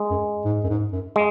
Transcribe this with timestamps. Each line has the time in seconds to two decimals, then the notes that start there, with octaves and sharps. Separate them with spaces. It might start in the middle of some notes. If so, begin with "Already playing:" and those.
Already playing: G#3
0.11 F#2
0.45 G#2
0.64 F#2
0.70 G#2
0.92 F#2
1.16 G#3